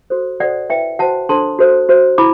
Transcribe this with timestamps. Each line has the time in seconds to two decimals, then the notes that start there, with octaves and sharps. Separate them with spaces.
0.10 F#4 A4 C5
0.40 F#4 A4 C5 D5 F#5
0.70 E4 B4 E5 G5
0.99 F#4 C5 F#5 A5
1.29 D4 A4 C5 A5 C6
1.59 F#4 A4 C5
1.89 F#4 C5
2.18 E4 B5 D6